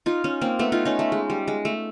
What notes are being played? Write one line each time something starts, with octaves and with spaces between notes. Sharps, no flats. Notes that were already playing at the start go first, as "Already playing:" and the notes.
D#4 F4
C#4 D#4
A#3 C4
A3 B3
D#4 F4
C#4 D#4
A3
G#3
G3
G#3
A3